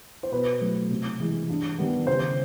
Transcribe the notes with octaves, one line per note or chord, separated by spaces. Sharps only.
C5
B2 B4
F#3 A3
C3
E3 G#3
G2
D#3 G3 B3
C#3 C5